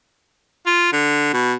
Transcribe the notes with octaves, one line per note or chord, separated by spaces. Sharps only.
F4
D3
B2